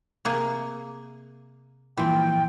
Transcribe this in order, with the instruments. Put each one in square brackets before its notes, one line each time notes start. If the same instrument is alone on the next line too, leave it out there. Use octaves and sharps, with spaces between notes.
[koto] C3 A#3 G#4
[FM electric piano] G2 A#2 F3 [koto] E3 C4 [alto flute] G5